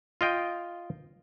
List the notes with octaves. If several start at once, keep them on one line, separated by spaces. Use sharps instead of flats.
F4 D#5 G5